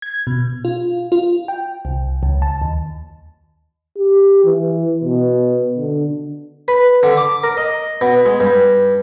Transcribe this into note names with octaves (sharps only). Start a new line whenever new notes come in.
G#6
B2
F4
F4
G5
C2
C#2
A5
D#2
G4
E3
B2
D3
B4
D3
D6
A#4
D#5
B2
G#3
G2